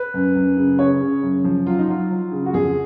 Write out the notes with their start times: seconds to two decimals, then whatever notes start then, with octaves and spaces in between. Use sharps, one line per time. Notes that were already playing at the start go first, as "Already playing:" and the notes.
Already playing: B4
0.14 F#2
0.35 F#2
0.57 C#3
0.79 C#3 C#5
1.01 C#3
1.23 F#2
1.44 F3
1.66 F#3 F4
1.79 D#4
1.88 F#3 F4
2.10 F#3
2.32 C#3
2.46 F#4
2.54 F2 G#4